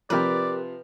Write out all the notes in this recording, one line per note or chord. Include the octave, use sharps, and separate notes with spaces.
C3 F3 G4 A#4 B4 D5 F#6